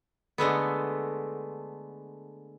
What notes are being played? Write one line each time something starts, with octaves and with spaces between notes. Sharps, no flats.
D3 G#3 A3 B3